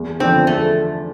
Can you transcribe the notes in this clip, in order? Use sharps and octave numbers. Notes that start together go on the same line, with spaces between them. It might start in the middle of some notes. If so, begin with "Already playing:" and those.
Already playing: E2
D3 F3 B3 C4 D4
E2 A3